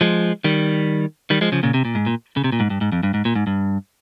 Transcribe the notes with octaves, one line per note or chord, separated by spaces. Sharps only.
F3 G#3
D#3 G3
D#3 G3
F3 G#3
C#3 F3
A#2 C#3
C3
A#2
G#2
A#2
C#3
C3
A#2
G#2
G2
G#2
F2
G2
G#2
A#2
G#2
G2